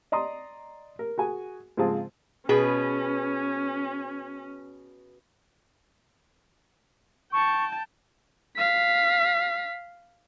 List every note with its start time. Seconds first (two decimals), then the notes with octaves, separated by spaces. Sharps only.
0.12 D5 D#5 A#5 C6 D#6
0.99 A#4
1.18 F#4 G#4 G#5
1.77 G#2 C#3 F3 C4 G#4 A5
2.49 B2 C#4 G#4 B4
7.32 G5 A5 C#6
8.57 F5 B6